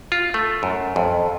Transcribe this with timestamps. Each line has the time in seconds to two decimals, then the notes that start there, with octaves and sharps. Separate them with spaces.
0.12 F4
0.34 A3
0.63 F#2
0.96 F2